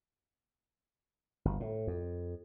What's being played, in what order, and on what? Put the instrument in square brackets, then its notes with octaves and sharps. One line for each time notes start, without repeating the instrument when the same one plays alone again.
[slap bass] G1
A2
F2